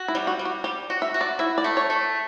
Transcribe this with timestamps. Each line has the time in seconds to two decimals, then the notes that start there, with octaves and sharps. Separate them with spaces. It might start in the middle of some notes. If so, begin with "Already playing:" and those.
Already playing: F#4
0.08 E4
0.15 G3
0.27 F#4
0.39 G3
0.45 F#4
0.64 G3 G4
0.90 F#4
1.02 E5
1.14 F#4
1.21 D5
1.39 E4 E5
1.58 D5
1.64 A3
1.77 C#5
1.90 A3